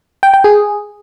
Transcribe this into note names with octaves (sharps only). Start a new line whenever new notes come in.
G5
G5
G#4